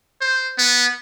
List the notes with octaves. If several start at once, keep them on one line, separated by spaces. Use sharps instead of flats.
C5
B3